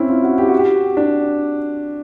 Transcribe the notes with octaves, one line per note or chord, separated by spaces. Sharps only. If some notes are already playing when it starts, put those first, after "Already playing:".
Already playing: C4 C#4 E4
F4
F#4
G4
F#4
G4
D4